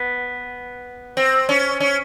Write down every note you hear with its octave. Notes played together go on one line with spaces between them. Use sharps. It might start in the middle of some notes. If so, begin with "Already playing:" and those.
Already playing: B3
C4
C#4
C#4